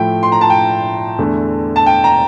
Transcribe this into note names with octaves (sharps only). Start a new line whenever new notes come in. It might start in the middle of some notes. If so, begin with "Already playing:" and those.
Already playing: A2 F3 A3 G5
C6
A#5
A5
G5
E2 D3 A3
A5
G5
A#5